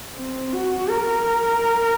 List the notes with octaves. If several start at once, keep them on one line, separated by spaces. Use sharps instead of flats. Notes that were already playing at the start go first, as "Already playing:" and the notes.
C4
F#4
A#4